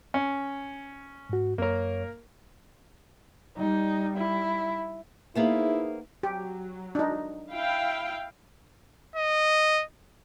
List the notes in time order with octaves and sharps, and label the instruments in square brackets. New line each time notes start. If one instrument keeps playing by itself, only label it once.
[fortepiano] C#4
[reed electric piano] G#2 F#4
[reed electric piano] F#2 C#5 [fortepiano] A#3 A#4
[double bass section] G3 [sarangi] D#4
[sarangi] E4
[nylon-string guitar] A#3 B3 C5 [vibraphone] D#4 G#4 E5 [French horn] E4
[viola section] F#3 [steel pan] G4
[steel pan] D4 D#4
[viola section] E4 F5 G5
[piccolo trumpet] D#5